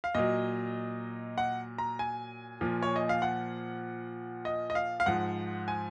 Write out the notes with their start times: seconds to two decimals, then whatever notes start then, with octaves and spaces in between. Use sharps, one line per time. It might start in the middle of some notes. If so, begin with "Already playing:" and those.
0.04 F5
0.15 A#2 F#3 D#5
1.38 F#5
1.78 A#5
1.99 G#5
2.61 A#2 F3
2.83 C#5
2.96 D#5
3.09 F5
3.22 F#5
4.45 D#5
4.70 D#5
4.75 F5
5.00 F5
5.06 G#2 F3 F#5
5.68 G#5